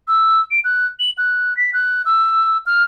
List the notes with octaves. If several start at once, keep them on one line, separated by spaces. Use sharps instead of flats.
E6
D7
F#6
F#7
F#6
B6
F#6
E6
F6